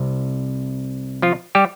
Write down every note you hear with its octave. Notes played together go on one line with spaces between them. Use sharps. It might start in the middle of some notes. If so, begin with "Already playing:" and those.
Already playing: C2 C3
F3 F4
G3 G4